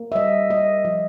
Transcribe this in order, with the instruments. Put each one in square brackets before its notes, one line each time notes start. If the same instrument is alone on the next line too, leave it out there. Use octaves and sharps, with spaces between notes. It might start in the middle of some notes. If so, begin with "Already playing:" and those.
Already playing: [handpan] A#3
E5
G3 D#5
A#3 D#5
F3 D#5